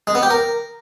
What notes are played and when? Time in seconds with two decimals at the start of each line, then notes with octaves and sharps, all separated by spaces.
0.07 G#3
0.15 B3
0.23 G4
0.30 A#4